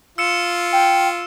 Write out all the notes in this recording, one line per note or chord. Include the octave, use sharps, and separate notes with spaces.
F4 E6 C#7 E7
G5